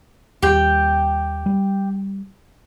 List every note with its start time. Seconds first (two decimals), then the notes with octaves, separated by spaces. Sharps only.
0.42 D#2 G3 G4 G5
1.46 G3